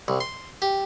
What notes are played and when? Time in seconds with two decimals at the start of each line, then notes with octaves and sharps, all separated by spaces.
0.08 C2
0.20 C6
0.62 G4